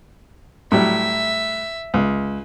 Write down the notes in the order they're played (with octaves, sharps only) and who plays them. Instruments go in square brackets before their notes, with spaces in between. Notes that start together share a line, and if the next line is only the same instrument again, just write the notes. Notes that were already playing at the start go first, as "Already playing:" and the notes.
[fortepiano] A2 F#3 G3 [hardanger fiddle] E5
[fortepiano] C#2